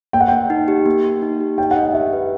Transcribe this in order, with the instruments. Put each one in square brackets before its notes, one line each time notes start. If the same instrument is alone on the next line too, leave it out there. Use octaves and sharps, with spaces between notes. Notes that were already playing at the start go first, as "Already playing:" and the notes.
[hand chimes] A#3 [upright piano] G5
[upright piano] F#5
[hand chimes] A#3 [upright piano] G5
[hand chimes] D#4
G4
A#3
A#3
D#4
G4
[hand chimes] D#4 [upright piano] G5
[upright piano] F#5
[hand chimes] D#5
[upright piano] F#5
[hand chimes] G4 [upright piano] E5
[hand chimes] B4